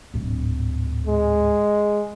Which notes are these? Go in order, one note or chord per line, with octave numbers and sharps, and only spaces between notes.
D1 G#2
G#3